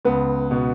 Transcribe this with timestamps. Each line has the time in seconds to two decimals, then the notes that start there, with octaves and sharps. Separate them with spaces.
0.05 C#2 B3
0.51 B2